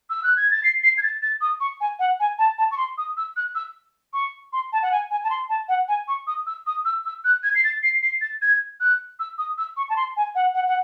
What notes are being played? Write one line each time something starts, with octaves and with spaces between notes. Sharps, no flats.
E6
F#6
G#6
A6
C7
C7
G#6
A6
A6
D#6
C#6
G#5
F#5
G#5
A5
A5
C#6
C6
D#6
E6
F#6
E6
C#6
C6
A5
F#5
G#5
G#5
A5
C6
A5
F#5
G#5
C#6
D#6
E6
D#6
E6
E6
F#6
G#6
C7
A6
C7
C7
A6
G#6
F#6
E6
D#6
E6
C#6
A5
C6
G#5
F#5
F#5
F#5